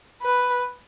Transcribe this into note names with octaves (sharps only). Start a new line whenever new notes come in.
B4